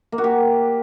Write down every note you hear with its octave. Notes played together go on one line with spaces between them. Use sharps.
A#3
F#4
G4